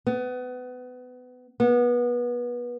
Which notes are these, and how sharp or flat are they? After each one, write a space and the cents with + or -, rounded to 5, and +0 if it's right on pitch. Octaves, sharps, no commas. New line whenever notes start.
B3 +25
B3 -25